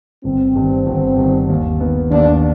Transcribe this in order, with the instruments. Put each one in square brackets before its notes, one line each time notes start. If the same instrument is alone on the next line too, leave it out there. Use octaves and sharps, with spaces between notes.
[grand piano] G1 [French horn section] C4
[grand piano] G2 D#3
G1
G2 D#3
D#2
D#3 B3
[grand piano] D#2 [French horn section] D4